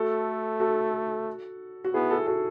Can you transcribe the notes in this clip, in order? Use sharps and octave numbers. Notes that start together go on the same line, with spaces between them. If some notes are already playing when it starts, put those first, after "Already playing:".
Already playing: A3 F#4 A4
F#4 A4
F#4
B3 E4 G#4
F#4 A4
F#4 A4